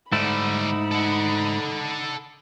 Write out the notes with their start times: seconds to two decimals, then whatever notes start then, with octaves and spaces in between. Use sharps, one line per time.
0.12 G#2 D3 G3 A3 D#4 E4 B5
0.91 A4 F#5